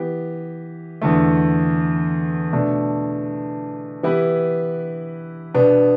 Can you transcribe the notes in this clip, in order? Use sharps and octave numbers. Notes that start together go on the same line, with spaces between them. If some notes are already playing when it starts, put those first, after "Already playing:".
Already playing: E3 B3 G4
E2 D3 A3
B2 A3 D4
E3 B3 E4 G4 B4
B2 B3 D4